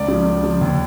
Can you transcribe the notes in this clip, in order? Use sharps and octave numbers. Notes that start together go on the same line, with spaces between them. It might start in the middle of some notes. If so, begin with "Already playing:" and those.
Already playing: C#2 D5
C#3 F3
C#2
C#3 F3
D#2